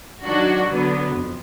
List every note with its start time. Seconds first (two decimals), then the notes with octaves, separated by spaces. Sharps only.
0.23 D#3 F#3 D4 F#4
0.68 D3 F#3 B3
1.12 F2